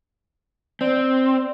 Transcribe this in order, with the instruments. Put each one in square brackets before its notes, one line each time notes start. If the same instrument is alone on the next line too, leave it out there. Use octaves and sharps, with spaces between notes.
[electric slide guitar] C4 [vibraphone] D5